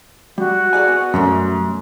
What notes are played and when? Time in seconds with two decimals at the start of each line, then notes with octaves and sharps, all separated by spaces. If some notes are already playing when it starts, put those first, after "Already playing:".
0.38 G3 F#4
0.73 G#4 D5 G#5
0.88 B3
1.14 F#2 B2 G3 A3